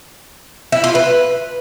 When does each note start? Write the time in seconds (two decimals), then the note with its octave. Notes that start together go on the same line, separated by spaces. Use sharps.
0.72 E4
0.84 F4
0.95 B4